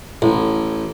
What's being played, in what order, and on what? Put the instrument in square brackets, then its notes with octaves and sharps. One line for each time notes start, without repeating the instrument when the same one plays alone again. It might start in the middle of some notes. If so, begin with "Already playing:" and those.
[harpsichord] A1